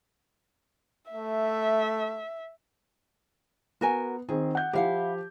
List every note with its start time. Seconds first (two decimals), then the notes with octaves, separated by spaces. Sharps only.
1.12 A3 E5
3.81 B3 F#4 A#4 G#5
4.29 D#3 C4 G#4
4.55 F#5 G6
4.73 F3 E4 G4 F5 F#5